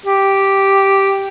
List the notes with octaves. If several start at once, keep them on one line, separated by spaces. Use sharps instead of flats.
G4